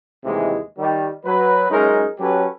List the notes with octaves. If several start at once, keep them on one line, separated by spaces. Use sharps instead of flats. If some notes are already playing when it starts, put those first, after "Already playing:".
D#2 A2 C3 E3 G#3
D#3 G3
F#3 B4
F#2 G#3 C#4 D#4 A#4
F#3 C#4 G4 A4 B4